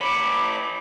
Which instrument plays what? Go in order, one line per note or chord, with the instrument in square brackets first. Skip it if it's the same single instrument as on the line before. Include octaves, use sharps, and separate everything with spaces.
[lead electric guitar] E3 C#5 [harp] B5 D7 [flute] D6